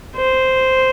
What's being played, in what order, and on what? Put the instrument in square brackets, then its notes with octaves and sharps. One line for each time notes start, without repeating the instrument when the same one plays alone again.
[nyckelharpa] C5